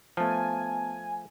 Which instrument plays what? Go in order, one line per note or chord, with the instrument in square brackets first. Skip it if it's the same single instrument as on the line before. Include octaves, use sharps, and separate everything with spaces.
[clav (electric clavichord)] F3 A3 [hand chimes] B3 A5 [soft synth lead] G#5